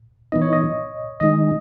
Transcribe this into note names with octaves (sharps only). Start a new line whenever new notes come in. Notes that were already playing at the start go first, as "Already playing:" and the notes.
E3 B3 D#4 D#5
C#5
D#5
D#3 G#3 D#4 D#5